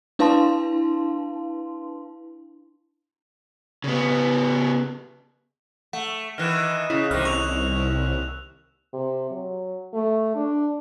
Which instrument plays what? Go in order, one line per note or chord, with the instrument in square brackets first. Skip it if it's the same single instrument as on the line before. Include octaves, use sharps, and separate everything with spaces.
[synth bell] D4 E4 B4 F5 A5 C6
[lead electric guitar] C#3 B3
[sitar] A3 [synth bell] F#5
[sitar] D#3 E3 [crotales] F6 F#6 E7
[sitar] C#3 [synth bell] E4
[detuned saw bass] C2 [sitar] C3 D#3 [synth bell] F6
[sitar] D#2 [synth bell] C#6 [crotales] E6 F#6 F7
[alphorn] C3
F#3
A3
D4